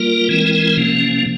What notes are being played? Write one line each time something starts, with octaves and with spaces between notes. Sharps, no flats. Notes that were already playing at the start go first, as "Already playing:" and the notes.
Already playing: G3 A#3 F4 A#4
E3 G#3 C4 E4 A#4
C3 F3 A#3 C#4